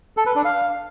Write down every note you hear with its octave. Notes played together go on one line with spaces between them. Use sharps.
A4
B4
D4
F5